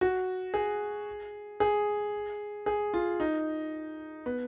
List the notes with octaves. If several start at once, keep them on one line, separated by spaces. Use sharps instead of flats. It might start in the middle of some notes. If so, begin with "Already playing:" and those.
F#4
G#4
G#4
G#4
F4
D#4
B3